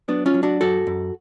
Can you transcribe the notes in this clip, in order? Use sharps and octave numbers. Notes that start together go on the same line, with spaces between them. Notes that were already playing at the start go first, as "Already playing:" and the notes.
F#3 B3 D4
C#4 F4
F#3
D4 F#4
F#2 F#4 A4
F#2